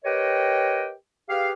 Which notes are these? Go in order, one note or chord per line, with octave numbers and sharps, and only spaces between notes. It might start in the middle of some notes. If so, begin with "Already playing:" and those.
G4 A#4 B4 C#5 D#5 G5
G4 G#4 B4 F5